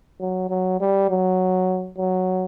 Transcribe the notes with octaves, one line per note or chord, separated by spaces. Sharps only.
F#3
F#3
G3
F#3
F#3